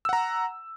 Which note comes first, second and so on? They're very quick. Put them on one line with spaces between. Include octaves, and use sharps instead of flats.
E6 F#5 A#5